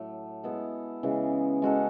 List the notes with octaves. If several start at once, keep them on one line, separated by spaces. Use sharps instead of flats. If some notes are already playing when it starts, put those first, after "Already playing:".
Already playing: A2 F#3 A3
G#3 B3 E4 A4
C#3 E3 G#3
G#3 C#4 F#4 A4